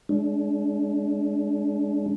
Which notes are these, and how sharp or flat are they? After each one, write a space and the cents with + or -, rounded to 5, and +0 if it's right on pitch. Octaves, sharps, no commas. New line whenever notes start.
G#3 +15 D4 -30